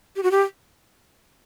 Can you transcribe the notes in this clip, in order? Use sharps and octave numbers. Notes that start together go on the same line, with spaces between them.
G4
F#4
G4